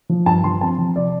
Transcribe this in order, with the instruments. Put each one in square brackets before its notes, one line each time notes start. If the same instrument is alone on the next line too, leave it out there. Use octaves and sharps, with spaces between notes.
[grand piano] F3
G2 A5
F3 C6
C4 A5
F3
C3 D5